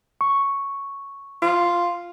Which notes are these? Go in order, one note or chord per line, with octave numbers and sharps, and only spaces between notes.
C#6
F4